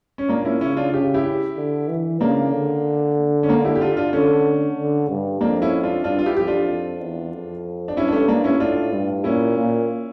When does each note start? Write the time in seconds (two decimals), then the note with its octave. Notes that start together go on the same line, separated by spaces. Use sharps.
0.18 C#4
0.29 A#2 A#3 D4
0.45 C#4 E4
0.61 C#3 C#4 E4
0.77 D4 F4
0.93 C#3 G4
1.14 E4 G4
1.57 D3
1.88 E3
2.20 C#3 A#3 D4
2.53 D3
3.43 C#4
3.49 A#3 D4
3.64 E4 G4
3.75 G4
3.81 D4 F4
3.97 D4 F4
4.13 D3 A3 C#4
4.77 D3
5.09 G2
5.41 F2 A#3 D4
5.62 C#4 E4
5.83 D4 F4
6.04 G2 D4 F4
6.19 F4
6.26 E4 G4
6.36 F2 G4
6.47 D4 F4
6.69 F2
7.01 E2
7.32 F2
7.88 D4
7.96 G2 C#4 E4
8.08 D4
8.12 A3 C#4
8.28 A#3 D4
8.44 C#4 E4
8.60 A2 D4 F4
8.92 G2
9.24 A#2 C#4 E4
9.57 A#2